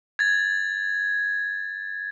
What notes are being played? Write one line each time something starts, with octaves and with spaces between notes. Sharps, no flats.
G#6 A6